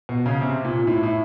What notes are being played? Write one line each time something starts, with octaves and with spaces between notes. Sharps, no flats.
B2
C#3
C3
A#2
A2
A2